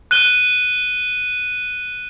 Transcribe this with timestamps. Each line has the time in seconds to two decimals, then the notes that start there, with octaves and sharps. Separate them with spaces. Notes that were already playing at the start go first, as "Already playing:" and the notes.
0.11 F#6 D#7 G7